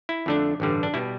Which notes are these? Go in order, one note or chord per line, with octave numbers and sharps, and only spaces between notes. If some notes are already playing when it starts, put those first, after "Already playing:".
E4
F2 D3 A3 D4
A1 G2 D3 G3
D4
B2 G3 E4